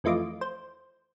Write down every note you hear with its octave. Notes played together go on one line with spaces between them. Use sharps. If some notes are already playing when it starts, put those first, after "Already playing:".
F2 E3 A3 F4 D#5 D6
C5